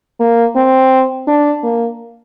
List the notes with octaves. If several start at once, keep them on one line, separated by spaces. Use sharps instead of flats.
A#3
C4
D4
A#3